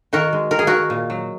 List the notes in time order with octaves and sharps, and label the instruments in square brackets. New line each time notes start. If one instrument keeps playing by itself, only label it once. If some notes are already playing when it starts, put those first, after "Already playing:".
[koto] D#3 F#4 A#4
G#3
D#3 A#4
G#4
D#3 F#4 A#4
A#2
F#3